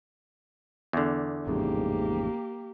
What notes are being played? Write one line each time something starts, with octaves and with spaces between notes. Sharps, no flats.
E2 D3
A1 F2 G#2 C#3 A#3 G4